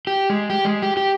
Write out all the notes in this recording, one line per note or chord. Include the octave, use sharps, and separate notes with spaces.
G4
G#3
G4
G#3
G4
G4